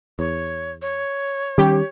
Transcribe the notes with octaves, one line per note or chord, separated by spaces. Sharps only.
E2 C#5
C#5
D#3 G3 C#4 G4